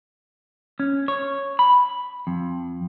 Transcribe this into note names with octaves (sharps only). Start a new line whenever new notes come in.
C#4
C#5
B5
F2